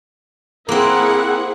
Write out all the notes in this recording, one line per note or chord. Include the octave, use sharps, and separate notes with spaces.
A#3 C4 E4 G#4 A#4 F#5